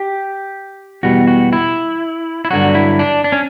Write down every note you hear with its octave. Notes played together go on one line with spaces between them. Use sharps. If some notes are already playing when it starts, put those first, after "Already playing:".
Already playing: G4
E2 B2 G3 F#4
F#4
E4
E4
G2 D3 F#3 F#4
E4
D4
D4
C#4